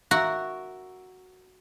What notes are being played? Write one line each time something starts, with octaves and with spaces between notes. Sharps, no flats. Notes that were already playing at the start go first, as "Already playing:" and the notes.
F#4 A#4 E5